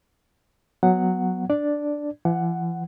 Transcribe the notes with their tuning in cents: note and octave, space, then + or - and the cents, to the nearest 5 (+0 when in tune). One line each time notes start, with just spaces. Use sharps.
F#3 -5 B3 +0 F#5 +0
D4 +0 D5 +0
E3 +45 F#5 +5